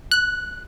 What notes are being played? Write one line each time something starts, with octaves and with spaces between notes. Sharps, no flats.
F#6